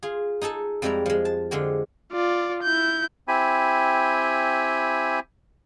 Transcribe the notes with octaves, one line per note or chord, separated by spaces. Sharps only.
F4 G#4
D#4 G#4 A4 A5
F2 G3 G#3 E4 D5 A#5
F3 G#3
A5
D3 F3 G#3 G4
F4 D5
E4 G6
C4 E4 G4 G#5 B5